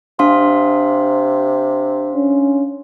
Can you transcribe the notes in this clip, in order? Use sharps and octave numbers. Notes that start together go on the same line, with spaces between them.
C3 D4 F5 C6
C#4